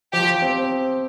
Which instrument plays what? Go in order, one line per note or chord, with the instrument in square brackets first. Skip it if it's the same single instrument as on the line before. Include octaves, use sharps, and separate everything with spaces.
[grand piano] F3 [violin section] G4
[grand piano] C4